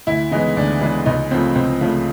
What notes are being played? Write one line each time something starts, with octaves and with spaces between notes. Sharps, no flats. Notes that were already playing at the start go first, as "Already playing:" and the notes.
D2 E4
C#3 E3 G#3 B3 D#4
D2 D4
C#3 E3 G#3 B3
C#2 D#4
C#3 F3 A3 C4
C#2 C4
C#3 F3 A3